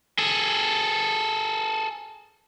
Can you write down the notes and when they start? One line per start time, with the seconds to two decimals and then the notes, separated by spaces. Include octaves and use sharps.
0.19 G#4 A4